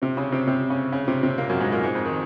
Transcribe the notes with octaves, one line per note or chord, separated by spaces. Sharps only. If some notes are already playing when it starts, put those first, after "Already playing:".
C3 C4
C#3 C#4
C3 C4
C3 C4
C#3 C#4
C#3 C#4
C3 C4
C3 C4
A#2 A#3
F#2 F#3
G#2 G#3
A#2 A#3
G#2 G#3
F2 F3
D#3